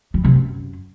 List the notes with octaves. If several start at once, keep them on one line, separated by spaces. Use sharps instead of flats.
G3
C3
F#2